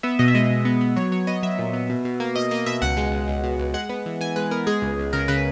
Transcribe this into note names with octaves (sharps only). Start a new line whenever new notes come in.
B3 E5
B2 D#5
E5
G#3 D#5
B2
B3
B3
F#3 C#5
F#3 C#5
B3 D#5
F#3 E5
A#2
B3
B2
B2
A#3
B2 D#5
A#3 D#5
B2 E5
C#2 F#5
G#3
C#2
C#2
B2
C#2
G#3 F#5
B3
E3
E3 G#5
G#3 B4
B3 A#4
G#3 G#4
C#2
C#2
C#3 A#4
C#3 B4